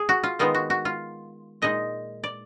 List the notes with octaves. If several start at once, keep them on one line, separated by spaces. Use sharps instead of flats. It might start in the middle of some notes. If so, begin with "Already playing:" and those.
Already playing: G#4
F#4
F4
D#3 G#3 B3 D#4 F4
F#4
F#4
F4
A#2 G#3 D#4 D#5
D5